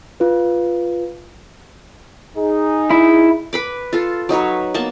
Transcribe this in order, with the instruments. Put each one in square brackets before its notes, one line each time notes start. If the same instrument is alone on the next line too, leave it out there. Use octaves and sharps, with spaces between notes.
[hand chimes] F4 B4
[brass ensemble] D#4 G#4
[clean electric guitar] E4
[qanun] B4 B5 D6
F4 A4
F#3 D#4 B4 C#5
A#3 B3 A5